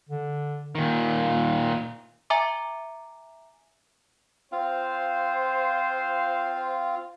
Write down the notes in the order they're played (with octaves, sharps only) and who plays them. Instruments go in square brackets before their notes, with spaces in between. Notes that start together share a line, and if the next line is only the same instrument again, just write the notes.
[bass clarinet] D3
[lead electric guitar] A#2 D#3
[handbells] E5 G#5 A#5 D6
[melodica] C4 F4 F5 [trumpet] C5